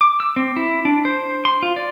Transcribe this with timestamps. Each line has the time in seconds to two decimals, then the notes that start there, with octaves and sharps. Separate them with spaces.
0.01 D6
0.20 E6
0.36 C4
0.57 E4
0.85 D4
1.05 C5
1.45 C6
1.63 F4
1.76 D5